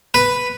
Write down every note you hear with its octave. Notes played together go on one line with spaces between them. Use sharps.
B4